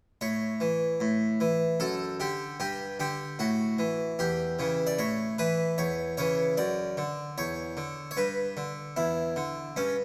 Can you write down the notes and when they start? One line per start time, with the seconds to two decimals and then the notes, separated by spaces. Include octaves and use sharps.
0.21 A2 C#5
0.60 E3
1.00 A2
1.40 E3
1.80 F#2 A4
2.20 D3 G4
2.60 G2 G4
3.00 D3 G4
3.39 A2 F#4
3.79 E3
4.19 E2 G4
4.59 C#3 E3
4.87 D5
4.99 A2 C#5
5.38 E3 B4
5.78 E2 C#5
6.17 C#3 E3 C#5
6.57 F#2 D5
6.97 D3
7.38 E2 C#5
7.77 D3
8.11 C#5
8.17 G2 B4
8.57 D3
8.96 E2 E4
9.36 D3
9.76 G2 C#4